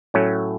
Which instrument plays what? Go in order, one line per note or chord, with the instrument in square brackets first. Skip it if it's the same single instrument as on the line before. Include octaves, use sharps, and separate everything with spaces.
[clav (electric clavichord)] A2 F#3 A3 C#4